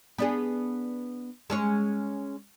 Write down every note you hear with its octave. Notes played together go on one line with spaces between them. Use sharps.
B3 D4 G#4
G#3 C#4 C#5